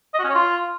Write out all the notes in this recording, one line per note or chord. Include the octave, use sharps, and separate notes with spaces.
D#5
F#4
C#4
C#5
F4